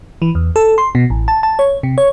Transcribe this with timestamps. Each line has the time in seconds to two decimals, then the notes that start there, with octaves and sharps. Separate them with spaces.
0.22 E3
0.35 E2
0.56 A4
0.78 C6
0.95 B2
1.10 A1
1.28 A5
1.43 A5
1.59 C#5
1.83 C3
1.98 C#5